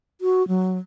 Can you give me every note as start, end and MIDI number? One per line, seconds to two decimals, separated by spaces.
0.21 0.46 66
0.48 0.78 54